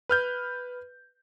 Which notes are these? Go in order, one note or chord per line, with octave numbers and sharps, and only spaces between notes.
B4 F6 G6